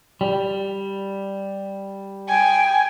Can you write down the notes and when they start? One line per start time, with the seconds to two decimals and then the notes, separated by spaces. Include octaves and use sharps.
0.21 G3
2.28 G5 G#5